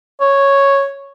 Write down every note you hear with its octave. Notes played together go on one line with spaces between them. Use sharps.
C#5